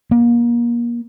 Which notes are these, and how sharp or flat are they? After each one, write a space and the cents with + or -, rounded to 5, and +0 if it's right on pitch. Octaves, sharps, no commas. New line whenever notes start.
A#3 +30